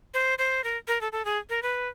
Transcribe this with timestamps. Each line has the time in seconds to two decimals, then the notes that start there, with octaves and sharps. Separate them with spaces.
0.14 C5
0.38 C5
0.64 A#4
0.88 A#4
1.01 A4
1.12 A4
1.25 G#4
1.50 A#4
1.63 B4